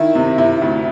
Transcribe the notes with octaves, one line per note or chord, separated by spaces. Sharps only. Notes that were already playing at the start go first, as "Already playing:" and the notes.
Already playing: D#3 E4
C3
C3 E4
D2